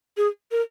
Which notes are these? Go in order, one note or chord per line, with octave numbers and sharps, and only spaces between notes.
G#4
A#4